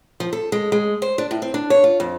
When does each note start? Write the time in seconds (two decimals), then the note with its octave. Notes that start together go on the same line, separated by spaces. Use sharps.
0.20 F3
0.33 A4
0.52 G#3
0.72 G#3
1.02 C5
1.18 D4
1.31 A2
1.42 C4
1.54 D4
1.70 C#5
1.84 F4
2.00 F2